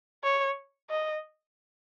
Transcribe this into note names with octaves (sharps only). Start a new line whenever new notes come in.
C#5
D#5